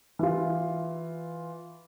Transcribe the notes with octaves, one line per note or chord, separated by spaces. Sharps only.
E3 F4